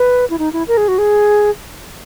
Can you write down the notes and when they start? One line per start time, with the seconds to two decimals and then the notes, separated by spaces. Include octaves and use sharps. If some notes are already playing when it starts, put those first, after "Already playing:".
Already playing: B4
0.30 E4
0.39 D#4
0.53 E4
0.68 A#4
0.77 G#4
0.88 F#4
0.98 G#4